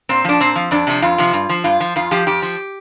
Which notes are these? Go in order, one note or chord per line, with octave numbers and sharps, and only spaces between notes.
A#2 C4
F3 D4
A#2 C4
F3
F2 D4
C3 F3
F2 F4
C3 F3
G2
F3
G2 F4
F3
F2 F4
F3 G4
F2 G4
F3